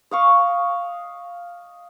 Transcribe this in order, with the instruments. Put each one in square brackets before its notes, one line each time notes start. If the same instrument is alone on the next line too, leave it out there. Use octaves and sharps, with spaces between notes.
[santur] D#5 F5 C#6